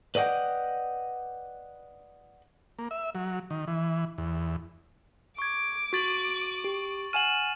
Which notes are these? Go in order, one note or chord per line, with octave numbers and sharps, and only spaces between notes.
B4 D5 D#5 F#5 G5
A#3
E5
F#3
D#3
E3
E2
C#6 D6 G#6
F#4 C#6 A6 F#7
G4
F#5 G#5 F6 D#7 E7 F#7